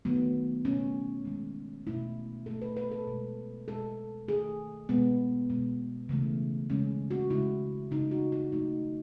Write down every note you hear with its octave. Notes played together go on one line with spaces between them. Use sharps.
D#3 F#3 A3 B3
B2 A3 C#4
D#3 G#3
B2 A3 E4
B2 F#3 A3 A4
B4
B4
A4
B2 G#3
B2 G#3 A4
D#3 A3 G#4
B2 G#3 B3
B2 G#3
C#3 E3 A3
C#3 G#3 C#4
F#4
C#3 G#3 E4
C#3 E3 A3 D#4
F#4
F#4
D#3 F#3 A3 D#4